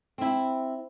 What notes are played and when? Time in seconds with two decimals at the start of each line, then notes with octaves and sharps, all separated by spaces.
0.18 C4 E4